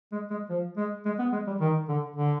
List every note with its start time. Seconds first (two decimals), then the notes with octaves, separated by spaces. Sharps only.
0.12 G#3
0.30 G#3
0.49 F3
0.77 G#3
1.05 G#3
1.19 B3
1.32 G#3
1.47 G3
1.60 D#3
1.89 D3
2.16 D3